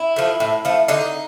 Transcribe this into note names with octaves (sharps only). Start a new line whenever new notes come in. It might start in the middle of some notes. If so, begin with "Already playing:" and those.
Already playing: E4
F3 A3
A2
F3 A3
D3 D#4